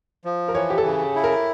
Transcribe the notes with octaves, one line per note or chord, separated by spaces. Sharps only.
F3
A#4
E3 C#5
G4
A4
C#3
E4
A#4